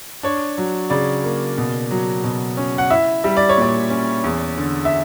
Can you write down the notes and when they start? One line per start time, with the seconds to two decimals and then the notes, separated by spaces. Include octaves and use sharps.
0.23 D4 C#5
0.58 F#3
0.90 C#3 D5
1.24 A#3
1.58 B2
1.91 F#3
2.24 B2
2.57 C#4
2.78 F#5
2.90 E4 E5
3.24 G3 E5
3.37 D5
3.49 C#5
3.58 A#2 D5
3.90 C#4
4.24 E2
4.57 D3
4.85 E5